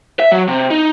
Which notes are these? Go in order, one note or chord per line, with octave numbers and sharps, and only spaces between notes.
E5
F#3
C3
D#4